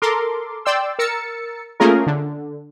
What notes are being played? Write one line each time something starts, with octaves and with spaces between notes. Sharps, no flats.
A4 A#4 C6 D6
D5 G5 C6 E6
A#4 E6 A6 C#7
A3 A#3 C#4 F4 G#4 A#4
D3